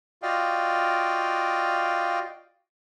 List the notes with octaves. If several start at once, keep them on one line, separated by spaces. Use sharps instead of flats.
F4 F#4 D5 D#5 F5 G5